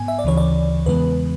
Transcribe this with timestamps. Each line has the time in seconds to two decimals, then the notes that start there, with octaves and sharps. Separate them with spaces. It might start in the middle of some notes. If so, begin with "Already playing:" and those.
Already playing: G#2 B3 G#5
0.08 E5
0.19 D5
0.24 D2 C#3 E3 C#5
0.37 D5
0.86 E2 C#3 E3 G#3 B3 B4